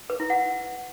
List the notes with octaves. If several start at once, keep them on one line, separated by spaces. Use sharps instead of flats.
B4
E4
F#5